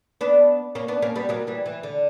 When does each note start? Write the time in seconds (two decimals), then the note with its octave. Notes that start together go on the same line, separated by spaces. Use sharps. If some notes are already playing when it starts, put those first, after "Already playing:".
0.21 B3 D4
0.75 A#3 C#4
0.88 B3 D4
1.02 A#3 C#4
1.16 G3 B3
1.29 F#3 A#3
1.47 E3 G3
1.66 E3
1.83 D3